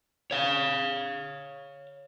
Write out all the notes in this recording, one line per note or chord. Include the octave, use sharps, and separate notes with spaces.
C#5 F5